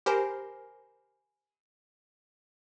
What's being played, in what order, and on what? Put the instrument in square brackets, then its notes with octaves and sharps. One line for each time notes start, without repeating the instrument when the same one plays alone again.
[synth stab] G4 A#4 C5 [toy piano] G#5 B5